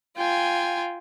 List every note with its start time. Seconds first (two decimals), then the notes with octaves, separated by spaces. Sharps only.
0.17 F4 G5 G#5